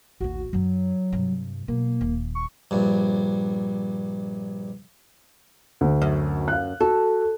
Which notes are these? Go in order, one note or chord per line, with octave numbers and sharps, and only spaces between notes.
A1 D#2 F#4
F#2 F#3 D4
G2 C3
B2 F#3 A#3
D#1
C#6
A#1 G2
D2
F#2
F5 F#6
F#4 A4